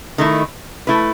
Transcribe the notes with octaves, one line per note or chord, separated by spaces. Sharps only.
D#3 A3 E4
A3 E4 B4